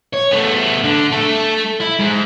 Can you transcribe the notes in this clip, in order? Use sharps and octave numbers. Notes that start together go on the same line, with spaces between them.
C#5
A3 B3
D3
A3 A4
E4
G#2